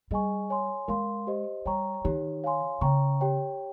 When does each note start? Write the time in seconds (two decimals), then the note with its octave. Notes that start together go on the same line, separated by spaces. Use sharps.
0.11 G3 G#4 D#5 G#5 C#6
0.50 C#5 G#5 C6
0.88 G#3 A#4 F5 C6
1.27 G4 C5 D#5
1.66 G3 C#5 G5 A#5 C#6
2.05 D#3 D#4 G4 C#5
2.44 C#5 F5 G#5 C6
2.81 C#3 C#5 G5 A#5 C#6
3.21 G4 C#5 G5